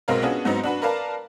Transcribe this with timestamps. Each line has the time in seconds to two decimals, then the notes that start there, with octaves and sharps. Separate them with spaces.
0.08 B1 B2 G#3 C4 A#4 F5
0.22 B3 C#4 D4 F4 F#4 G#4
0.45 G#2 F#3 B3 C4 D#4
0.63 D4 F#4 B4
0.82 A#4 B4 D5 F5 A5 A#5